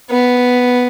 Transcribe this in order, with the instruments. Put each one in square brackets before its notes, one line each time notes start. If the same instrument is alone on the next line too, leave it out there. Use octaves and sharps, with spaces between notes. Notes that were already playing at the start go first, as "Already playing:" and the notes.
[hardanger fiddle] B3